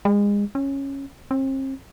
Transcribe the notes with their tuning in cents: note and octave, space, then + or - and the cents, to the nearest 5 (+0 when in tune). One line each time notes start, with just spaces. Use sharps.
G#3 -30
C#4 -10
C4 +40